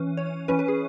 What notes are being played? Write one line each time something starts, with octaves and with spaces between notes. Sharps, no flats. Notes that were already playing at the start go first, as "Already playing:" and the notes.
Already playing: E3 C#4
C#5
E3 C#4 B4
B4
G#4